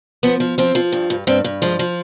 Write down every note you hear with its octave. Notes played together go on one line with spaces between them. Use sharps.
F3 B3
F3
F3 C4
F3
G2
G2
G2 C4
G2
F3 G#3
F3